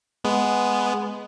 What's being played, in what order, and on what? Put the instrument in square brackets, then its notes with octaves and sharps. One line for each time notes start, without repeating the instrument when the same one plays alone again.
[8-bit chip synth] G#3 B3